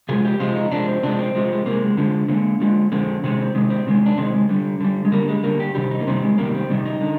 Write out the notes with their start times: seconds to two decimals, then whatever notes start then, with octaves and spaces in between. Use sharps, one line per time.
0.09 C3 F3 G#3 G#4
0.25 G4
0.40 C3 F3 G#3 F4
0.55 D#4
0.71 C3 F3 G#3 D4
0.87 C4
1.03 C3 F3 G#3 D4
1.19 C4
1.35 C3 F3 G#3
1.53 G#3
1.66 C3 F3 A#3
1.71 G#3
1.82 G#3
1.97 D3 F3 G#3
2.28 D3 F3 G#3 A#3
2.60 D3 F3 G#3
2.92 D3 F3 G#3 C4
3.24 C3 D#3 G#3 C4
3.39 C4
3.55 C3 D#3 G#3
3.70 C4
3.86 C3 D#3 G#3
4.06 D4
4.18 C3 D#3 G#3 C4
4.34 G#3
4.49 D3 G3
4.81 D3 G3
5.05 G#3
5.12 D3 G3 A#3
5.28 G#3
5.44 D3 G3 A#3
5.60 G4
5.75 C3 D#3 G3 G4
5.91 D#4
6.00 A#3
6.07 C3 D#3 G3 C4
6.22 G#3
6.38 C3 D#3 G3 A#3
6.54 C4
6.70 C3 D#3 G3
6.85 D#4
7.01 D3